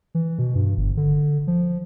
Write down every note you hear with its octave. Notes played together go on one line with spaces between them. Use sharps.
E3
B2
G2
G1
D3
F3